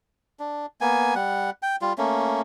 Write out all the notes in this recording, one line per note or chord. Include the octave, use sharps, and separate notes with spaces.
D4
A#3 B3 G#5
G3 F#5
G5
G3 F4
A3 A#3 C#4